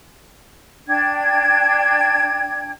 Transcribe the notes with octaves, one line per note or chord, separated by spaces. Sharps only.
D4 G5 G#6